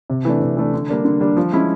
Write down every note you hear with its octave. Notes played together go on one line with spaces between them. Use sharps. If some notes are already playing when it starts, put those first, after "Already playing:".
C3
E3 A3 D4
C3
E3 A3 D4
D3
G3 A#3 D4
D3
G3 A#3 D4
F3
G#3 C#4 E4